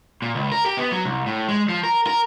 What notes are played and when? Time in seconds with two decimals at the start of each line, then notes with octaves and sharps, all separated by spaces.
0.22 A#2
0.35 C#2
0.52 A#4
0.66 G4
0.77 B3
0.93 F#3
1.05 C2
1.26 A2
1.49 G#3
1.69 F3
1.83 A#4
2.07 A#4